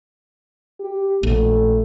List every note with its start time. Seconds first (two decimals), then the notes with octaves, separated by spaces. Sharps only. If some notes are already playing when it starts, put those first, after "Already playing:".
0.80 G4
1.23 A#1 A3